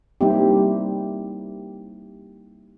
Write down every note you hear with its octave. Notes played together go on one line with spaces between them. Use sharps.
G3 A#3 C4 D#4 E4 G4